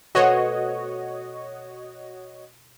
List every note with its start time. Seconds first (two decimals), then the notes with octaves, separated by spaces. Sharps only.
0.15 B2 A3 F#4 C5 C#5 D#5